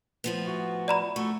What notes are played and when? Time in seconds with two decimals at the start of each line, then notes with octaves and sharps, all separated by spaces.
0.24 A2 F3 B3
0.46 F#4
0.88 D5 A#5 B5
1.16 A3 F#4 A4 C#6